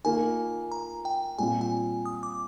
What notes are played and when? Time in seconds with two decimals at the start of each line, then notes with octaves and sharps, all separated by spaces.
0.04 D#3 A#3 F4 G#5
0.72 A#5
1.05 G5
1.38 A#2 G3 C4 F4 G#5
1.61 G#5
2.06 D#6
2.23 D6